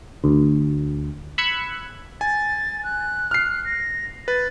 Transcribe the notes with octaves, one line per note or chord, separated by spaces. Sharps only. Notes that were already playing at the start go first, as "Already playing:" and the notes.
D2
B5 E6 F#6 G#6 C#7
G#5 A6
F#6
F6 C7
A#6
B4 A6